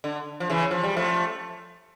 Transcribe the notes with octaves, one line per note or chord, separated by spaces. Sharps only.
D3
F3
C#3 E3
F3
G3
F3 A3